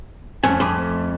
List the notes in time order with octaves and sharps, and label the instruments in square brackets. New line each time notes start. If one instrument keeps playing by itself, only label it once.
[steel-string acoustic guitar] F2 [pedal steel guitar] A3 C#4 G#5
[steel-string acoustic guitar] F2 [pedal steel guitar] G#4 B5 D6
[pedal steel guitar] A3